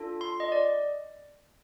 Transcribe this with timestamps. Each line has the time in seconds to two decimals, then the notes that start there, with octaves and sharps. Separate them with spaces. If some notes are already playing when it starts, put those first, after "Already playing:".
Already playing: D4 F4 A4
0.21 C6
0.40 D#5
0.52 D5